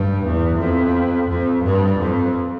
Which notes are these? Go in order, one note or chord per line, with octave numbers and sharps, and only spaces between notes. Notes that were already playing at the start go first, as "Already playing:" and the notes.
Already playing: G2
E2
F2
F2
G2
F2